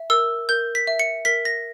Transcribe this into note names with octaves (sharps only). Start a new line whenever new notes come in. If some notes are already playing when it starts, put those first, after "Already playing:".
Already playing: E5
A#4 E6
A#4 G6
B6
E5
C#7
A#4 B6
A#6